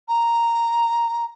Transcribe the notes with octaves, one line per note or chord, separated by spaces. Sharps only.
A#5